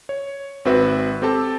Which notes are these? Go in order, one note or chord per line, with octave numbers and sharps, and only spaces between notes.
C#5
G#1 C4 F#4 B4 E5
C4 G4 A4 A5